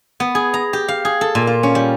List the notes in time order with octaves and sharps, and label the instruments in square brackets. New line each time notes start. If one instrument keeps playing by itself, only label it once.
[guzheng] B3
G#4
A#5
G4
F5
G#4
A4
A#2
F4
C#4
G3